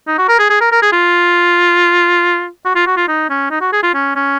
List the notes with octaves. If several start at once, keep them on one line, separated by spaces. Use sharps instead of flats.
D#4
F#4
A#4
G#4
G#4
A#4
A#4
G#4
F4
F#4
F4
F#4
F4
D#4
C#4
D#4
F#4
G#4
F4
C#4
C#4